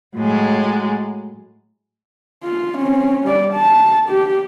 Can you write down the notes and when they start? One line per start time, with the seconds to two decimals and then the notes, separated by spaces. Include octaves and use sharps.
0.15 A2 F#3 G#3
2.44 F4
2.78 C4 C#4
3.24 G3 D5
3.54 A5
4.09 G4